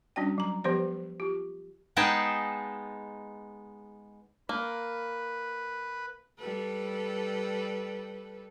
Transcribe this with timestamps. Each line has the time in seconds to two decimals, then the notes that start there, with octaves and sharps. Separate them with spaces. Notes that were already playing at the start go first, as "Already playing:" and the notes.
0.16 G3 C#4 D4 F#4 D5 G5
0.38 F#3 A#5
0.64 F3 B3 G4 B4 C5 D5
1.20 F4 G4
1.96 G#3 B3 D#4 G#4 G5 A5
4.49 A#3 B4
6.39 G3 A4 B4